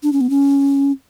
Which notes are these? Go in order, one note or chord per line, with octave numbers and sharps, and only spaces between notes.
D4
C#4
B3
C#4